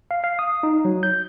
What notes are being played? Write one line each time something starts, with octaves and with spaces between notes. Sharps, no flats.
F5
F5
D#6
D#4
F#3
G6